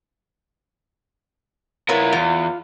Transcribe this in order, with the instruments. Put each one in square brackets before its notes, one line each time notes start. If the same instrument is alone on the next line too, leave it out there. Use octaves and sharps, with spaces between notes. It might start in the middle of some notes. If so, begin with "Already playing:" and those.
[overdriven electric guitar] E4 A#4 [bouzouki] F4 B4 C#5
[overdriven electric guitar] E2 [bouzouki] F4